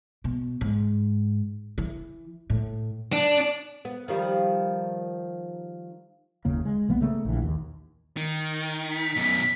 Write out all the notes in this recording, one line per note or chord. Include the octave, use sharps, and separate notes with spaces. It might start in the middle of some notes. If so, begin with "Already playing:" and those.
B2
G#2
E3
A2
D4
B3
D#3 F3 G3
F#1 D#2 C#3 A#3
G#3
B1 E3 A#3 B3
C#3 A3 A#3
A#1 E3
D#2
D#3
B6
F#2 B2